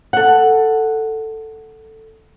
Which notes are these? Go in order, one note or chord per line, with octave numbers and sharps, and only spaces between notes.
A4 F#5